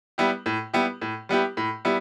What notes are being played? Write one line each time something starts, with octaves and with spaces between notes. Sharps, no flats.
G3 B3 E4 G4
A2
G3 B3 E4 G4
A2
G3 B3 E4 G4
A2
G3 B3 E4